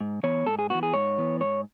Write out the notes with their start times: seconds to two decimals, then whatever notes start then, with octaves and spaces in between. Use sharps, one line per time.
0.01 G#2
0.23 E3 B3 C#5
0.47 G#2 A4
0.59 G#4
0.70 E3 B3 F#4
0.83 G#4
0.94 G#2 C#5
1.18 E3 B3
1.40 G#2 C#5